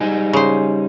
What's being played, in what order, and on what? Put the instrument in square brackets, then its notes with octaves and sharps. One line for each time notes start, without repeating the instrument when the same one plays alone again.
[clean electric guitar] G3 D#4 G#4
[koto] C#3 C5